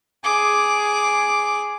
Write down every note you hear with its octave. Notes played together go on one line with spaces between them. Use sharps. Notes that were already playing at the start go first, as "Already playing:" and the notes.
G#4 D6